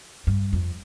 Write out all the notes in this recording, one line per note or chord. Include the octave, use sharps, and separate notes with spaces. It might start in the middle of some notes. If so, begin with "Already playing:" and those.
G2
F2